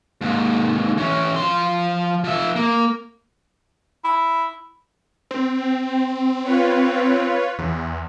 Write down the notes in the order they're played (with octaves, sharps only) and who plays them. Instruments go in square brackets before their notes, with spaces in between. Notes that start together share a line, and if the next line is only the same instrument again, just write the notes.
[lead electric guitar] D#2 G#2
E3 C#4
F3 C6
F3 E5
A#3
[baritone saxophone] E4
[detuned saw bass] C4
[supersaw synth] F4 B4 C#5
[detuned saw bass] E2